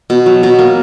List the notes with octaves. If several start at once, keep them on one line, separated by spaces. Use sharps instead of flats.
B2
F#3
B2
A#3